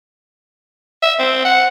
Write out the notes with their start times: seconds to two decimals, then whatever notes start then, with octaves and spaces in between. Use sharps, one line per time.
1.03 E5
1.19 C4
1.45 F#5